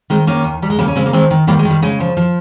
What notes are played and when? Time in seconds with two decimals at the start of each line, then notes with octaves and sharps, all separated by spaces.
0.10 D#3 G#3 C4
0.27 D#3 A#3 C#4
0.44 D#2
0.62 D#2 G3
0.70 G#3
0.79 C#3 G3 A#3
0.88 C#4
0.96 C#3 G#3 C4
1.06 A#3
1.13 D#3 G#3 C4
1.30 D#3
1.47 D#3 G3 A#3
1.59 G#3
1.65 D#3
1.70 G3
1.82 C#3 G#3
2.00 F3
2.17 F3